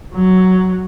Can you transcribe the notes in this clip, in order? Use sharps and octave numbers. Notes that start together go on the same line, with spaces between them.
F#3